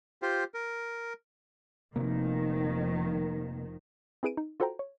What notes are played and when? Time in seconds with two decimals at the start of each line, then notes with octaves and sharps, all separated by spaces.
0.22 F4 G4 C5
0.54 A#4
1.96 F1 C3 D#3 F3 A#3
4.23 C4 E4 G#4 B4 D7 D#7
4.37 D#4
4.60 F4 F#4 A4 C5 G5 A#5
4.79 C#5